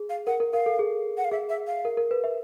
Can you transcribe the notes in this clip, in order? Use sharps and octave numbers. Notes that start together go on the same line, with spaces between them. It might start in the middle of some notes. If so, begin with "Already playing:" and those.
Already playing: G#4
F5
A#4 F#5
A#4
A#4 F5
A4
G#4
F#5
F5
G#4 E5
E5
F5
A#4
A#4
B4
E5